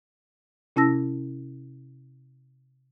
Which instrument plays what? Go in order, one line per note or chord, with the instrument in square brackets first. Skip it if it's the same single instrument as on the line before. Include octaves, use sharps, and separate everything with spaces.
[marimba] C3 C#4 E4 A5 E6 A#6